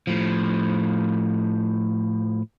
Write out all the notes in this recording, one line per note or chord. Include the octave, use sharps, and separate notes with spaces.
A2 F3